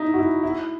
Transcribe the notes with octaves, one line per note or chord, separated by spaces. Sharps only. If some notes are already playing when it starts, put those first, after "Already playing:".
Already playing: D#4 E4
F#4
E4
E4